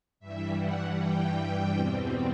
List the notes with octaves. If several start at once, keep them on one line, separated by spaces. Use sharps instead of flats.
G2 E3 G3 E5
F#5
G5
E2 B2 G3 C4